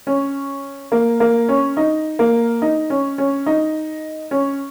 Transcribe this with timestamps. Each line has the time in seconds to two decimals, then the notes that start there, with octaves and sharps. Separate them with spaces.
0.07 C#4
0.92 A#3
1.20 A#3
1.49 C#4
1.77 D#4
2.19 A#3
2.62 D#4
2.90 C#4
3.18 C#4
3.46 D#4
4.31 C#4